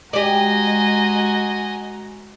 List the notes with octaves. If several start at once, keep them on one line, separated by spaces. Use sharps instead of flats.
G#3 F#4 G4 D5 D#5 G#5 A#5